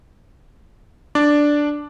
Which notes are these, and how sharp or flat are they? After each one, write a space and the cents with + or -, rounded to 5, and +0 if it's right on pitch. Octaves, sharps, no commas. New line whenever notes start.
D4 +0 D5 +0